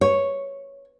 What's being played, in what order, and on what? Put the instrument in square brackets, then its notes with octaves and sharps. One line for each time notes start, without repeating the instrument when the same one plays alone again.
[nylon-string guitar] C#5